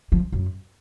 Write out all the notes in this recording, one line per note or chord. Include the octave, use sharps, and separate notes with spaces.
F3
F#2